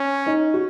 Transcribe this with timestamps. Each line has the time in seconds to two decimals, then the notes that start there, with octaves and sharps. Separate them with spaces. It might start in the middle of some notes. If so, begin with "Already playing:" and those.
Already playing: C#4
0.26 D#4
0.54 F#4